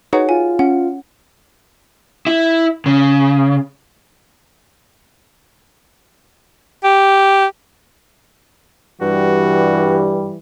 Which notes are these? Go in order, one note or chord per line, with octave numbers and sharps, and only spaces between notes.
D#4 F#4 G#4 B4 C#5 F#5
F4 G#5
C#4 F#5
E4
C#3
G4
G2 E3 G3 F#4